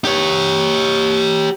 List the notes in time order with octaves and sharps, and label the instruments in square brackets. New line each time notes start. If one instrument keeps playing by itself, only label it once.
[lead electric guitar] G4 C#5